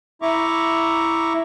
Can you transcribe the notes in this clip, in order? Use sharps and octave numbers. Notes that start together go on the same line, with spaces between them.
E4 E5 A#5 C#6 D6